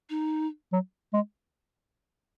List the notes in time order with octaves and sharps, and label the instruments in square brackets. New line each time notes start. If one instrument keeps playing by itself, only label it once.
[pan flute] D#4
[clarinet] F#3
G#3